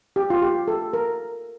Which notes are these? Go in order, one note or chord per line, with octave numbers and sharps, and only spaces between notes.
G4
F4
G4
A4
A#4